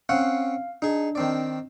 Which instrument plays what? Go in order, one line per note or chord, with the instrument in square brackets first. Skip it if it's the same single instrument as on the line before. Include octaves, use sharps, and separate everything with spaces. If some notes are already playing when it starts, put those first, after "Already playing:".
[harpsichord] C4 C#4 F#5 [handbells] F5
[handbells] D4 [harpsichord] D#4 G#4
[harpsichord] D#3 C4 D5